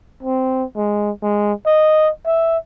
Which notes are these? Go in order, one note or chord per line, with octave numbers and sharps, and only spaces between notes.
C4
G#3
G#3
D#5
E5